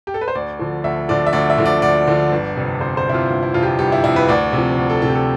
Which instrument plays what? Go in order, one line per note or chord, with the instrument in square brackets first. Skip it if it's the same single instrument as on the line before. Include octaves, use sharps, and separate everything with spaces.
[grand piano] G4
A4
B4
C5
D2 D5
D3 F3
D2 E5
D3 F3 D5
E5
D2 D5
E5
D3 F3
D5
D2 D5
D3 F3
G1
F2 C3
G1 C5
C5
F2 C3 E4
F4
G1 F4
E4
F2 C3 F4
G4
F4
G1 G4
E4
F2 C3 E4
B4
D2 D5
C3 F3
D2
A4
C3 F3 A4
G4
A4